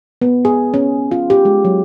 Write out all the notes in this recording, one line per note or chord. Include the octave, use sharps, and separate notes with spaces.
B3
G#4
C#4
F4
G4
G#3
F#3